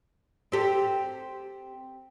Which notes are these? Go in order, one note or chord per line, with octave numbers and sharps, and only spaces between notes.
C4 G4 A4